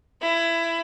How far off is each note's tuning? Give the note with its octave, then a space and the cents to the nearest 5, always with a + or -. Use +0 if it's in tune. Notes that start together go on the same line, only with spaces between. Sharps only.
E4 +20